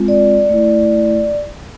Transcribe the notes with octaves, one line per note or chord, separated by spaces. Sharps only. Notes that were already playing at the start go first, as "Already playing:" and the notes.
Already playing: G#3 C4 F4
D5
A3 E4